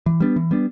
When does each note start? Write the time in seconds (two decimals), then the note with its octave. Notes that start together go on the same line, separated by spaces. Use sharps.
0.06 E3
0.20 G3 B3 D4
0.36 E3
0.51 G3 B3 D4